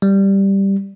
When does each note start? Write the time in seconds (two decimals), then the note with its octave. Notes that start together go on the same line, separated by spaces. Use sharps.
0.02 G3